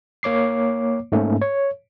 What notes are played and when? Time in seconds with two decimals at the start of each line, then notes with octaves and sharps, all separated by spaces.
0.23 A#3 C#5 D6 C7
1.12 G#2 A3 A#3 C#4
1.42 C#5